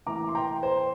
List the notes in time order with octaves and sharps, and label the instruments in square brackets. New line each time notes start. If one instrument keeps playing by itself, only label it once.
[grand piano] A2 E3 A#3 A#5 D6
C6
G5 A#5
C5